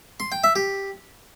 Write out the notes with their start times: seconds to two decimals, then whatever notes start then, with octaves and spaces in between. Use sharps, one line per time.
0.20 C6
0.32 G5
0.44 E5
0.56 G4